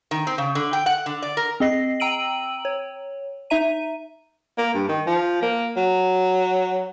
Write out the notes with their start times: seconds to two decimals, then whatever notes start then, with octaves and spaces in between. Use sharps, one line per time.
0.11 D#3
0.27 C4
0.38 C#3
0.55 D3
0.73 G5
0.86 F#5
1.06 D3
1.22 D5
1.37 A#4
1.60 C4 G#4 D#5 A#6 C7
2.00 G5 A#5 E6 D7 D#7 F#7
2.65 C#5
3.50 D#4 E5 A#5 D#7
4.58 A#3
4.74 G2
4.89 D#3
5.07 F3
5.42 A#3
5.77 F#3